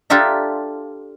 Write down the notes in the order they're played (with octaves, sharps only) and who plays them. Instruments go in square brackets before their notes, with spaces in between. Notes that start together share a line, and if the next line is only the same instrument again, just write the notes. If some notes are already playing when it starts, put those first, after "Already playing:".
[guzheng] D4 F4 G4 A4 E5 A#5